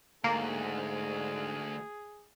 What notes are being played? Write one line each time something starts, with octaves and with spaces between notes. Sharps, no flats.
D2 G#2 A#3 G#4